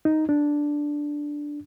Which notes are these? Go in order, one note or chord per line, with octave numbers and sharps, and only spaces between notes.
D#4
D4